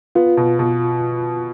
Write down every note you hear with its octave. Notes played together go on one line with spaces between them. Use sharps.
B3 F4
B2
B2